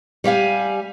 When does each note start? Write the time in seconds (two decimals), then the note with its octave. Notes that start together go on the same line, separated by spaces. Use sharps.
0.24 G3 G4 F5 G#5